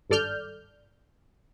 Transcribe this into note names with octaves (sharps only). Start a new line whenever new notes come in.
G#1 G2 A4 D5 F6 G6